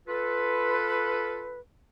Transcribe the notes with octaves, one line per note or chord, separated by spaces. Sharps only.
F4 A4 B4